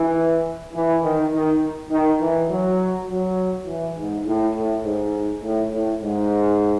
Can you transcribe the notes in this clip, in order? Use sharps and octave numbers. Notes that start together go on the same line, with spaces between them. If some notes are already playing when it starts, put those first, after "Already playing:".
Already playing: E3
E3
D#3
D#3
D#3
E3
F#3
F#3
E3
G#2
A2
A2
G#2
A2
A2
G#2